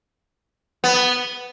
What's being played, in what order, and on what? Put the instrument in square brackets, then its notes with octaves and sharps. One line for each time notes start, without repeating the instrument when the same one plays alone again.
[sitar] B3